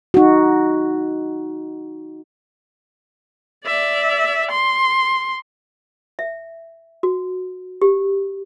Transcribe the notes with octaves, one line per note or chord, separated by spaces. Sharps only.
D#4 F#4
D5 E5
C6
E5
F#4
G4